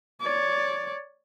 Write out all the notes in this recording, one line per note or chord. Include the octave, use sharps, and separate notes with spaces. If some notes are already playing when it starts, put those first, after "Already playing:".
C#5 D5